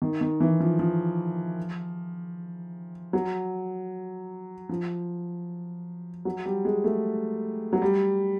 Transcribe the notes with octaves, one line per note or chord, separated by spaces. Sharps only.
D#3
D#3
E3
F3
F3
F#3
F3
F#3
G3
G#3
A3
F#3
G3